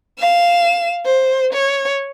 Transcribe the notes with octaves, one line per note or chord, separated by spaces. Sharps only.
F5 E7
C5
C#5